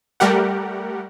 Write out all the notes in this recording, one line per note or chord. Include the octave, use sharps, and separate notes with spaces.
G3 A3 G4 A#4 F#5